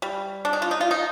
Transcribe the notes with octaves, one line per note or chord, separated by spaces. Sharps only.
G3
D4
D#4
F4
D#4
F4
D#4